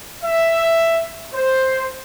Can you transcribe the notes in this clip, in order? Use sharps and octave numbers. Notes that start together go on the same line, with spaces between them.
E5
C5